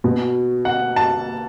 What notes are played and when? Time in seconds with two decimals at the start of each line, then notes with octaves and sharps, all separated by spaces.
0.04 B2
0.65 F#5
0.96 A5